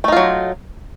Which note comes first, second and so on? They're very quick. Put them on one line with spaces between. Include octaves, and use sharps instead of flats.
A3 D#4 F4 F#3